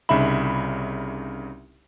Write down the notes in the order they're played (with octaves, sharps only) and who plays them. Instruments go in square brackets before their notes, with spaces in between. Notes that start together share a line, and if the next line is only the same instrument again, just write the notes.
[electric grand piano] C2 C#3 D#4 E5 B5